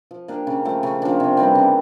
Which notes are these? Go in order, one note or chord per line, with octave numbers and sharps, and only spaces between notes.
F3
A#3 D4 G4
C#3
F3 A3
C#3
F3 A#3 D4
C3
E3 G3 C4
C#3